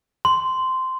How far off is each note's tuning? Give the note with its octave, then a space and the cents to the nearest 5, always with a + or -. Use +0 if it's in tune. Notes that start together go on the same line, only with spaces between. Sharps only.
C6 -10